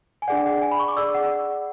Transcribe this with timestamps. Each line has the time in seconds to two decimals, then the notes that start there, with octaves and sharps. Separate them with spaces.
0.22 G#5
0.28 D4 G#4 D5 F#5
0.46 F#5
0.62 G#5
0.71 B5
0.80 C#6
0.88 D6
0.97 G#4 D5 E6
1.14 F#5